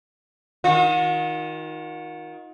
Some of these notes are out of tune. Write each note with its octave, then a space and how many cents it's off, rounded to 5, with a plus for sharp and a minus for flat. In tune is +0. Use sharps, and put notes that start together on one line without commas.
D#3 +20 F#4 -45